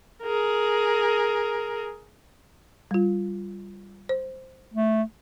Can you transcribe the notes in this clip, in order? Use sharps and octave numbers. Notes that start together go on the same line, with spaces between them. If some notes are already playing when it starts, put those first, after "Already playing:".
G#4 A#4
G3 F4
C5
A3